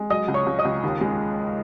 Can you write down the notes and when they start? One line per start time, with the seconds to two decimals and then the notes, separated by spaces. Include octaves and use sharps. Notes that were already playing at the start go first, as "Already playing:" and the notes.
Already playing: G#3
0.10 F#3 D#5 D#6
0.28 C#2
0.34 C#5 C#6
0.46 C#2
0.59 D#5 D#6
0.65 C#2
0.83 D#2
1.01 G#3